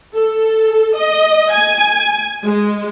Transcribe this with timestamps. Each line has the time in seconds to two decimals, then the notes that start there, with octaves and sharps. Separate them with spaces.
0.14 A4
0.97 D#5
1.53 G#5
2.45 G#3